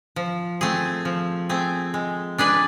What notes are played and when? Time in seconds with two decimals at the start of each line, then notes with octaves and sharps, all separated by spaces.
0.16 F3
0.61 A3 C4 G#4
1.05 F3
1.49 A3 C4 G#4
1.94 G#3
2.38 D4 G#4 B4 D5